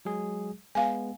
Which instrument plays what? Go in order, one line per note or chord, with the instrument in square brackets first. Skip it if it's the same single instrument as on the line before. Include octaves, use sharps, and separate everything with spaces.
[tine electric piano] F#3 G#3 G#4
[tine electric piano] G#3 B3 [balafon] F5 G#5